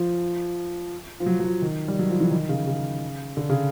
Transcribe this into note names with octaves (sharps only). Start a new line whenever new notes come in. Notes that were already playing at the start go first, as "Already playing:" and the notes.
Already playing: F3
F3
F#3
F#3
F3
D#3
G3
F#3
F3
E3
D#3
C#3
C#3
D3
C#3